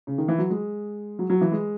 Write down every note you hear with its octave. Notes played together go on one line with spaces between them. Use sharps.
C#3
D#3
E3
F#3
G#3
F#3
F#3
E3
G#3